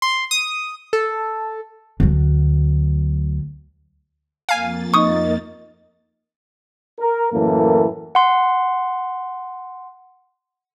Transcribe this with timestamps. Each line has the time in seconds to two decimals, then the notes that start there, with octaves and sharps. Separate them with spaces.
0.02 C6
0.31 D#6
0.93 A4
2.00 D2 F#3
4.49 F2 A#3 F5 G#5 A6
4.94 D#4 C#6 D#6
6.99 A#4
7.32 F#2 A2 E3 A#3 A4 A#4
8.15 F#5 C6